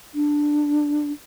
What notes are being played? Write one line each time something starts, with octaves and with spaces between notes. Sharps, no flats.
D4